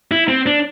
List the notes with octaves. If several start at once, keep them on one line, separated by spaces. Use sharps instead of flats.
E4
C4
D4